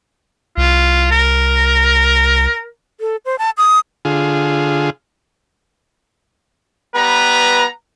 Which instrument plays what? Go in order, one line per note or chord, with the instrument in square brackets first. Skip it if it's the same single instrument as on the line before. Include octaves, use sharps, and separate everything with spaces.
[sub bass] C2 [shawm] F4
[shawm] A#4
[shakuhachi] A4
C5
A5
D#6
[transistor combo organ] D3 F4 G#4
[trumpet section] G3 B3 B4 A#5